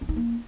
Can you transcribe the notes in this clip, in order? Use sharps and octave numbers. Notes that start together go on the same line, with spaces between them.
C#4
D#4
A#3